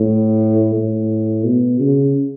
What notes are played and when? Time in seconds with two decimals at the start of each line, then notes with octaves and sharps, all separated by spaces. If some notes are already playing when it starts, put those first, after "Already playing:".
Already playing: A2
0.76 A2
1.44 B2
1.80 C#3